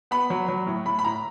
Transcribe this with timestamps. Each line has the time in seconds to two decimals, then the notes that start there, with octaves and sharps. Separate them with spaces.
0.11 B3 B5
0.30 F#3
0.48 F#3
0.67 A2
0.86 A2 B5
0.99 B5
1.05 A2 A#5